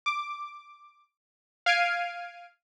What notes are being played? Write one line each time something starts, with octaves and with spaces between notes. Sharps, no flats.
D6
F5 F6 G#6 C7 D7 D#7